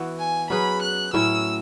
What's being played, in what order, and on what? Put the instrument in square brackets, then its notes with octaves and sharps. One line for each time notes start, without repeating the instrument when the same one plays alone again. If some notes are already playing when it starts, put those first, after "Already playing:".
Already playing: [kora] E3 B3 F#4
[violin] G#5
[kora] F#3 C#4 G#4 B4 [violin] B5
[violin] F#6
[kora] A2 F#3 C#4 E4 [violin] E6